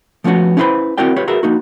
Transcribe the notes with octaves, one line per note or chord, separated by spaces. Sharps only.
F3 A3 B3 C#4 F#4
C#4 E4 F#4 B4 C5 B5
C4 E4 F#4 A#4 D5 G5
F4 G4 B4 C#5
F#4 G#4 A#4 B4 E5
A#3 D#4 F#4